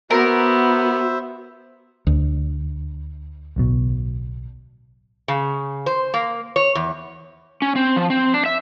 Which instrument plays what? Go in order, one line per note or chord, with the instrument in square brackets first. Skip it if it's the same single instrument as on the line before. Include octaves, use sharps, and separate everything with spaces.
[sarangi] B3 [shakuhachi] F#4 [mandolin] A#4 [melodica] C5 E5
[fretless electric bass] D2
[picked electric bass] D1 B1 B2
[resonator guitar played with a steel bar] C#3
C5
A#3
C#5
E2
[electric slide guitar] C#4
C4
F3
C4
D4
E5